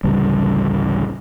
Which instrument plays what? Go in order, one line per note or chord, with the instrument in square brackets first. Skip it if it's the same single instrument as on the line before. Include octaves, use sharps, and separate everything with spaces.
[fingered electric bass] A1 D2 C#3 G3